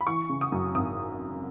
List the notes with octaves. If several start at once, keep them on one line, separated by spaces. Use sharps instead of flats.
B5
E3 C#6
C#3
D#6
F#2
G#1 D#6